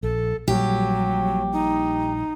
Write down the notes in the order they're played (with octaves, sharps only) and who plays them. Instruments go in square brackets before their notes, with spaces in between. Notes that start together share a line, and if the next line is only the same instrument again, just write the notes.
[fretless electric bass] A#1 [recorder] A4
[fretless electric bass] A#1 A#2 G3 [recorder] F#3 [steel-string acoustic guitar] G4
[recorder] D#4